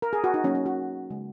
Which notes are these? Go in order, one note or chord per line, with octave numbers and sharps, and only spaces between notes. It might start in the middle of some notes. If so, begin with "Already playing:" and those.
A#4
G#4
F#4
D#4
F#3 A#3 C#4
C#4
F#4
C#3 G#3 C#4